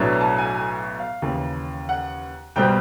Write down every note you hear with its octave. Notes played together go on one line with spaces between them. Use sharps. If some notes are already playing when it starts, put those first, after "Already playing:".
Already playing: B1 A2 F#3 B3 D4
A5
G#5
G#5
F5
D#2 C#3 E3
F#5
B1 B2 G3 C4 G5